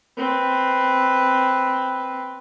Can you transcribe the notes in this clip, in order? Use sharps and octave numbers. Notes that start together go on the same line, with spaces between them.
C4 B4